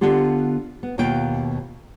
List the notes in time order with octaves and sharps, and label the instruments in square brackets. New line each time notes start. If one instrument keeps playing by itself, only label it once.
[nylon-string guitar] D3 B3 F4 G4
B3
D#2 B2 A#3 F4 G5